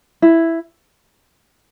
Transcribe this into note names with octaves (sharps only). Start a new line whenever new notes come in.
E4